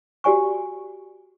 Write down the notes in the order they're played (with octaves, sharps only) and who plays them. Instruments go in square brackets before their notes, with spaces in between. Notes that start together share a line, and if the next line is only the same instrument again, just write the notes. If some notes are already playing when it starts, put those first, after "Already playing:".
[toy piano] F#4 G4 D5 G#5 C#6